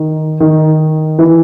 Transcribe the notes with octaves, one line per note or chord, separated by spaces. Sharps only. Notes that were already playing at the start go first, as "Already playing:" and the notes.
Already playing: D#3
D#3
E3